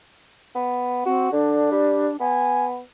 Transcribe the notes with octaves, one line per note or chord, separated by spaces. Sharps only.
B3
C4 F#4
D3 D4
G3
B3 G#5